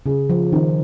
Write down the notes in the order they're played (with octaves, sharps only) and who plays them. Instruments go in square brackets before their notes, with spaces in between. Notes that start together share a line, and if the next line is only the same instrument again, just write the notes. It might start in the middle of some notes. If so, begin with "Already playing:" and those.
[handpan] C#3 [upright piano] G#4
[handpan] F3
[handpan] D#3 [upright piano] D#4